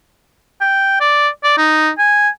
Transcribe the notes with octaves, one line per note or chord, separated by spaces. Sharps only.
G5
D5
D5
D#4
G#5